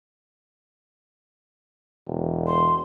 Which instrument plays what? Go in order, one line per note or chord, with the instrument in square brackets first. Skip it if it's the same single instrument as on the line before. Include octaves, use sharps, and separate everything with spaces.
[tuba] E1
[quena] C6